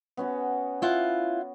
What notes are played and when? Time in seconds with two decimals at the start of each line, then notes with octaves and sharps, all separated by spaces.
0.17 B3 C#4 F#4
0.82 E4 F4 F#5